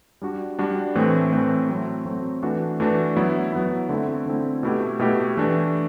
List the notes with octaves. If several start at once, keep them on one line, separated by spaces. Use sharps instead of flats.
G3 D4 F#4
G3 D4 F#4
A2 E3 A3 C4
A2 E3 A3 C4
F#3 A3 C4
F#3 A3 C4
E3 A3 D4 F#4
E3 A3 D4 F#4
F#3 B3 E4
F#3 B3 E4
D3 A3 C4 E4
D3 A3 C4 E4
B2 A3 E4 G4
B2 A3 E4 G4
E3 A3 D4 G4